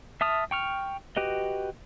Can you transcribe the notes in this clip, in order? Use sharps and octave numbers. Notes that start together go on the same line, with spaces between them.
E5 A5 D#6 F6
G5 C#6 F6
F#4 G4 B4 D#5